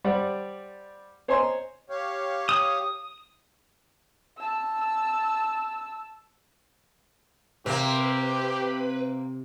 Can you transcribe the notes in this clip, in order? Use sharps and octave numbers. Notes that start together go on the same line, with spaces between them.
G3 C5 D5 F#5
C5 C#5 D#5 G#5 A#5 C6
G4 C#5 F5
D#6
A5 E6
C3 A#3 C4 G4 B4